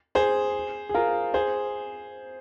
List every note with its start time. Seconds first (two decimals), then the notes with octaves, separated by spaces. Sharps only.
0.15 G#4 C5
0.89 G#4
0.94 F4 A#4
1.34 G#4 C5